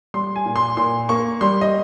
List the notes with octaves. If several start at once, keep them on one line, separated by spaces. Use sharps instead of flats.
G3 C6
G#5
A#2
C6
A#2 C6
A#3 C#6
G3 C6
D#5